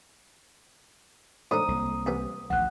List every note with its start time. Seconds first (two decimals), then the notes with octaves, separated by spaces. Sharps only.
1.51 A2 D3 D#4 C5 A#5 D#6
1.68 C2 A#3
2.06 E2 C3 B3
2.50 A1 D2 F3 F#5 F#6